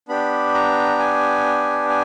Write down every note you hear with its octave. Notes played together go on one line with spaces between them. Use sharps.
B3 D4 G4 B5
A#5
G#5
G#5